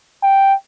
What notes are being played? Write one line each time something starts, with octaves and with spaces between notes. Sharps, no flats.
G5